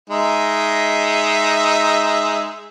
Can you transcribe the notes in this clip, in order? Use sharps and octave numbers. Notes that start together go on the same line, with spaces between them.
G#3 D#4 E5